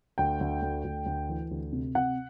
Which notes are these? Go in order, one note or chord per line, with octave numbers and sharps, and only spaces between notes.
D2 G5
D2
D2
D2
D2
E3
D2
C3
C3 F#5